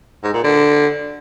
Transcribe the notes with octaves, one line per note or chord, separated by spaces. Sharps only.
G#2
A#2
D3